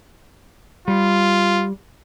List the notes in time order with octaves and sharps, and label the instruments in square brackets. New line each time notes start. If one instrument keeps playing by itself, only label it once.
[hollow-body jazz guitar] G3 [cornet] F4